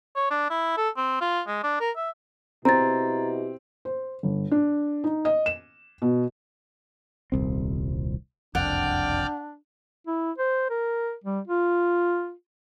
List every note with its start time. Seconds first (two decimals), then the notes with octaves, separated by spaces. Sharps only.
0.16 C#5
0.31 D4
0.50 E4
0.77 A4
0.97 C4
1.21 F4
1.47 G#3
1.63 D4
1.80 A#4
1.96 E5
2.65 B2 C4 E4 G4 A#5 A6
3.85 C5
4.23 G1
4.51 D4
5.04 D#4
5.25 D#5
5.46 E7
6.02 B2
7.32 D#1 C2 C4
8.55 F#1 C2 F2 D4 D5 F#5 G5 F6
10.07 E4
10.38 C5
10.70 A#4
11.24 G3
11.47 F4